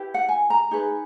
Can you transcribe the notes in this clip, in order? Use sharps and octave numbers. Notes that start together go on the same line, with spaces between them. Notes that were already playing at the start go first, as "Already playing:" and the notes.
Already playing: E4 G4 B4
F#5
G#5
A#5
D#4 G#4 B4